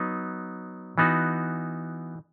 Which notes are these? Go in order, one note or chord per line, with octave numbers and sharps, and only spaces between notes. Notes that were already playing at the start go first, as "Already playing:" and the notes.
Already playing: F#3 B3 D#4
E3 B3 D#4 F#4